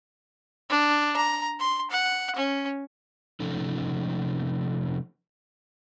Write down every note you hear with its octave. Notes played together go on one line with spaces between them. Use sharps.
D4
A#5
C6
F#5
C#4
C3 F3 A3 C#4 D#4 A4